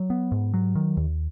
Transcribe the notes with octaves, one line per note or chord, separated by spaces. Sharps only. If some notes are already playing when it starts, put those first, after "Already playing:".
Already playing: F#3
B3
G#2
F#3
D#3
D#2